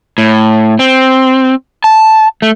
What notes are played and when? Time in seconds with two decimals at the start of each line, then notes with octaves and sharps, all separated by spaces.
0.18 A2
0.79 C4
1.84 A5
2.42 A3